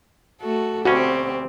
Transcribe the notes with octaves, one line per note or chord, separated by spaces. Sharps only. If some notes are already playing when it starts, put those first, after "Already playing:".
A3 F#4 A4
D2 B2 C4 C#4 F#4 G4